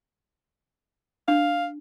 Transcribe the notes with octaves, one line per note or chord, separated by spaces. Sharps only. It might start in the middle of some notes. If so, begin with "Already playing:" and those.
D4 F5